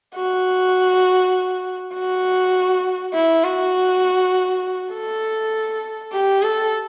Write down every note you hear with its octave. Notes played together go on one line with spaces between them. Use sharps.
F#4
F#4
E4
F#4
A4
G4
A4